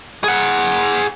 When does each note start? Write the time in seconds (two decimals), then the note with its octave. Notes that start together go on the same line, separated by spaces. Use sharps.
0.24 G#4 F#5